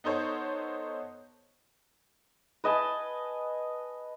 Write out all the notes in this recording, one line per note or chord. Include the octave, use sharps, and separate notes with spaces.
B3 D#4 A4 C5 C#5
B4 D#5 G#5 A5